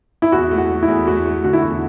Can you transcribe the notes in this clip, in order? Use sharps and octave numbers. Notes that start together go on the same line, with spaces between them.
E4
E2 F#4
A3
F#4
A3
E4
E2
A3 F#4
A3
D3 F#4
E4
E2 F#4